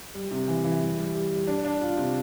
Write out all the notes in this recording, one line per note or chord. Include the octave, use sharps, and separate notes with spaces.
G3
C3
E3
E3
G3
G3
G3
G3
D4
D4
F4
C3